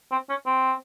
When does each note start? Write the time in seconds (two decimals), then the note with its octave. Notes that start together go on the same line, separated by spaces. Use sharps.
0.11 C4
0.29 C#4
0.46 C4